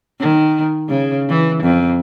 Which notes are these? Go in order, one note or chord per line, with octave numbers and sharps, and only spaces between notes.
D#3
C#3
E3
F2